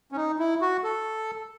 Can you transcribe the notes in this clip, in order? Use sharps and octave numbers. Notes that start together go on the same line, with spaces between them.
C#4
D#4
E4
F#4
A4